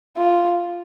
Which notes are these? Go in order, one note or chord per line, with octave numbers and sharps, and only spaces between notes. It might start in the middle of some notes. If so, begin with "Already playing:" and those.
F4